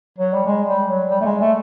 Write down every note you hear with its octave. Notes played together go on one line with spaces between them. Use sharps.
F#3
G3
G#3
G3
F#3
G3
A3
G#3
A3